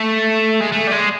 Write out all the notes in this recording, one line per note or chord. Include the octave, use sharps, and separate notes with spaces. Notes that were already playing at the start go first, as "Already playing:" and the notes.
Already playing: A3
G#3
A3
G3
G#3